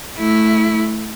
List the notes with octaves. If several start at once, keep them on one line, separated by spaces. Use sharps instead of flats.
A3 E4